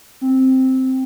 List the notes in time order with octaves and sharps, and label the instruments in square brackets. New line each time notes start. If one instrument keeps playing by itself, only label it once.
[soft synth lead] C4